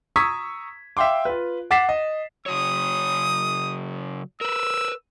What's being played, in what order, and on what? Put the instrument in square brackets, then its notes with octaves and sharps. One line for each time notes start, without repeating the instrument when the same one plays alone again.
[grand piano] A#5 C#6 D#6 E6 G#6 B6
E5 F5 G5 C6 D6
F4 B4
F#5 D6 A6 B6 C7 E7
D#5
[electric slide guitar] C#3 F#3 C#5 [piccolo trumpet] D#6
[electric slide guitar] A#4 B4 [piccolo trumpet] E6